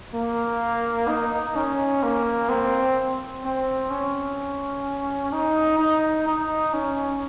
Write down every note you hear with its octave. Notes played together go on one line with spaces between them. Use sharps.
A#3
D#4
C#4
A#3
C4
C4
C#4
D#4
D#4
D#4
C#4